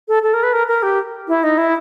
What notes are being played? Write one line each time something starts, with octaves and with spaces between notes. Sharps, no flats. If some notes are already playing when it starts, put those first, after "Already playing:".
A4
A4
A#4
B4
A#4
A#4
G4
E4
D#4
E4